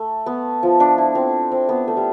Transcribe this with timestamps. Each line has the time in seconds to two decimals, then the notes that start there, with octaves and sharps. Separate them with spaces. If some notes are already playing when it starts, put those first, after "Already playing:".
Already playing: A3
0.26 B3
0.63 F3
0.80 D4
0.98 E4
1.15 C4
1.52 C4
1.69 B3
1.88 A3
1.97 G3